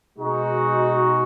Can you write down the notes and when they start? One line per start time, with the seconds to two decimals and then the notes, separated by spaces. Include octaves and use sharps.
0.18 B2 G#3 D#4 F#4